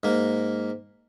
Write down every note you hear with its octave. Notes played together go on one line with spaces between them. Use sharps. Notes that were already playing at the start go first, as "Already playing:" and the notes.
G#2 A#3